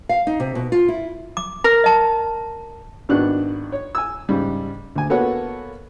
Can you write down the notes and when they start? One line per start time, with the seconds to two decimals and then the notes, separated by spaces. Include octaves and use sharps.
0.09 F5
0.27 D#4
0.40 C3
0.55 B2
0.72 F4
0.88 E4
1.37 D6
1.64 A#4
1.84 D#5 A5
3.09 G#1 D#3 B3 D4 F#4 F#6
3.72 C#5
3.95 G#5 E6
4.29 G#2 C#3 G3
4.96 D2 G#5
5.10 A#3 B3 F#4 A4 C#5 F#5